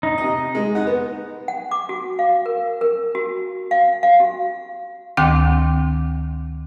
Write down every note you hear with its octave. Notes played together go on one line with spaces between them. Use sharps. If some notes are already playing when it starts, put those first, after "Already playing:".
D#4
C3 D#5
G#3
D#4 F#5
B3
F#5
D6
F#4
F5
A#4
A#4
F#4
F5
F5
F#4
D2 D#3 C4 G5 D6